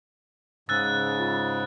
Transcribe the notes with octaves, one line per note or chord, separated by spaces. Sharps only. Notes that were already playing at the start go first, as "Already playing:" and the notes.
G#2 C#3 E6 F#6 A6
F4 B5